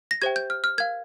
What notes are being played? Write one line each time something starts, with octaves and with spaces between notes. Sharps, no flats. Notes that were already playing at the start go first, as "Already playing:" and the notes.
A#6
G4 C5 E5 G5 G#6
G6
F6
F6
A#4 F5 G#6